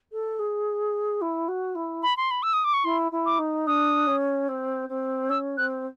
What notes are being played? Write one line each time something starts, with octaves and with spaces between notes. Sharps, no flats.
A4
G#4
E4
F#4
E4
B5
C6
B5
E6
D#6
D6
C#6
E4 C6
E4
D6
D#4
D4 D#6
C#4
C4
C4
C#4 E6
C4 F#6